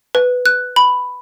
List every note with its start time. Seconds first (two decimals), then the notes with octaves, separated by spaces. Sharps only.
0.15 B4
0.46 F#6
0.76 B5